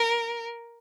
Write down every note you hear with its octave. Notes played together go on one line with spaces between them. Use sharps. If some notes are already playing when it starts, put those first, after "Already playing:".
Already playing: A#4